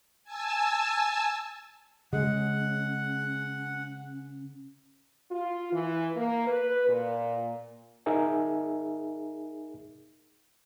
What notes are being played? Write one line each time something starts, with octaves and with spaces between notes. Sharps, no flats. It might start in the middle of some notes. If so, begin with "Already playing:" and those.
G#5 A5 E6
C#3 G#3 C#4 F#5
F4
E3
A#3
B4
A#2
D#4 G#4 A#4 E5 G#5